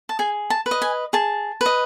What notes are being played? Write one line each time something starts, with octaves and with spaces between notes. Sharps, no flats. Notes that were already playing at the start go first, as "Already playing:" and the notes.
A5
G#4 G#5
A5
B4
D#5
G#5
G#4 A5
B4
D#5